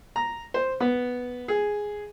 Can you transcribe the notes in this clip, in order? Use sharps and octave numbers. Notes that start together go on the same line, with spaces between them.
A#5
C5
B3
G#4